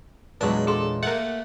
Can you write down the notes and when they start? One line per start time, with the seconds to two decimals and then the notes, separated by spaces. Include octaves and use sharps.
0.41 E2 A#2 F#3 G#3 D4 B4
0.67 G#4 A4 C6
1.03 A3 A#3 F#5